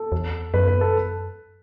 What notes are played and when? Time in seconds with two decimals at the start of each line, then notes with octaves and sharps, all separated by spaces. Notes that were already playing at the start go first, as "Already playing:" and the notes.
Already playing: A4
0.12 E2
0.54 F#2 B4
0.67 B4
0.81 A4